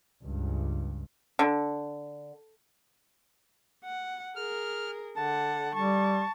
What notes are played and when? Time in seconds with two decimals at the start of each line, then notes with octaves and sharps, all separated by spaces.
0.23 C#2 G2
1.39 D3
3.84 F#5
4.36 G#4 A#4 F6
5.16 D3 F#5 A5
5.75 G3 A5 C#6